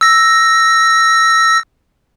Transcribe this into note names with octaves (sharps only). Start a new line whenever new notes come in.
E6 A#6